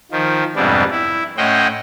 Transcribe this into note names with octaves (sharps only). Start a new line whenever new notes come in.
D#3 F3
F2 G#2 C3 G3 B3 D4
E4
A2 C#4 C5 D#5 F#5 G5